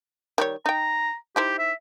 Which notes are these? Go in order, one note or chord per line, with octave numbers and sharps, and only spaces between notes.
D#3 G3 C#5
D#4 G5 A#5
D#4 E4 G4 C5
E5